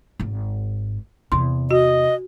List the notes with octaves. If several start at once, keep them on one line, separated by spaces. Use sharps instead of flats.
G#1 G#2
E2 C3 C6
F#4 D#5